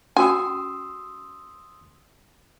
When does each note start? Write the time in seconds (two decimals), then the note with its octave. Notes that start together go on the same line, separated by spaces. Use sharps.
0.17 C#4 F#4 G5 G#5 C6 D#6 E6